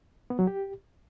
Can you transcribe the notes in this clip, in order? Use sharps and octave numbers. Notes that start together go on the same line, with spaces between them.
B3
F#3
G4